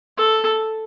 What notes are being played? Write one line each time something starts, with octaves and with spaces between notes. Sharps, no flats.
A4